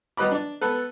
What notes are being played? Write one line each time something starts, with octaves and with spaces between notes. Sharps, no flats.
F#3 G3 B4 D#5 B5 D6
D4 D5
B3 A4 B4